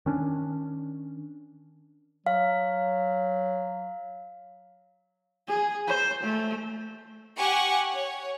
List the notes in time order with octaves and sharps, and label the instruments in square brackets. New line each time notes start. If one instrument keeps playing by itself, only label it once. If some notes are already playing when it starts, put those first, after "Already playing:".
[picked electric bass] D#3 C#4 D4
[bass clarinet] F#3 [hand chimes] F5
[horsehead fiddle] G#4
C5
A3
[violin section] G4 F#5 G#5 C#6
C#5